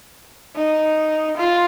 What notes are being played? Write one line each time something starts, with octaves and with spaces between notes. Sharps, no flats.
D#4
F4